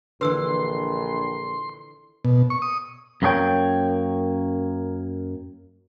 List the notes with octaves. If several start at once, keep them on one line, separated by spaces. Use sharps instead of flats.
A#1 D3 E3 B4 C6 E6
B2
C#6
D#6
F#2 A#3 F4 G#4 C#5 G5